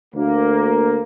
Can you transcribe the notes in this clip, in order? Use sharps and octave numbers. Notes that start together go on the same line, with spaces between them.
D2 A#3